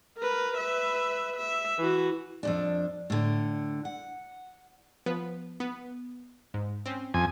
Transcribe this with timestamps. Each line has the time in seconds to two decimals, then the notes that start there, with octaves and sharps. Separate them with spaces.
0.18 A#4 B4
0.58 B4 E5
1.36 E5
1.78 E3 F#4
2.43 F2 G#2 D4
3.10 A2 D3
3.85 F#5
5.06 F3 B3 B4
5.60 B3
6.54 G#2
6.86 C4 C#4
7.14 F2 G#5